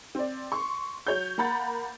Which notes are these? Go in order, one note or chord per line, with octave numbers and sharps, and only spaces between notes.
C4 D5
C6 C#6
F#3 C#5 G6
A#3 F#5 A#5 B5 A6